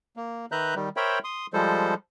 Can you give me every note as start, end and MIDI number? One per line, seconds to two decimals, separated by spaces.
0.17 0.46 58
0.52 0.75 51
0.52 0.75 71
0.52 0.75 76
0.52 0.75 82
0.52 0.75 90
0.52 0.75 91
0.76 0.89 51
0.76 0.89 55
0.96 1.19 70
0.96 1.19 72
0.96 1.19 73
0.96 1.19 76
0.96 1.19 79
0.96 1.19 83
1.24 1.46 84
1.24 1.46 87
1.53 1.94 53
1.53 1.94 55
1.53 1.94 56
1.53 1.94 69
1.53 1.94 72